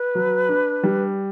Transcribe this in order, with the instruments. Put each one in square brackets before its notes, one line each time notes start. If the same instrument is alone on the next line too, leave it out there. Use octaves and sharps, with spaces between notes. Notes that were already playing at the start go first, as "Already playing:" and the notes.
Already playing: [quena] B4
[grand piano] F#3
D4
G3